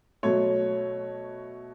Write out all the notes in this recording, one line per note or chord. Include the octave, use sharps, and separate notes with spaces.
B2 F#3 A3 C#5